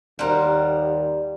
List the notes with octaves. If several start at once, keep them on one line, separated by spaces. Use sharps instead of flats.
D#2 G3 A#4 C5 F#5